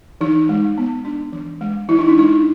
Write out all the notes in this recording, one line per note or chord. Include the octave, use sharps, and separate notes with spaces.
E3 D#4
G#3
B3
D4
E3
G#3
E3 E4
D#4
D4
G#3 D#4